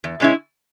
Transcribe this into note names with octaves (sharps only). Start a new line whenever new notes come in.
E2
B2 G#3 C#4 E4